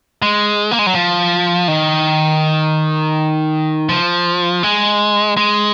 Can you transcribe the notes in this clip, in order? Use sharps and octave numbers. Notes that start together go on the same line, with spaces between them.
G#3
A#3
G#3
F#3
F3
D#3
F3
G#3
G#3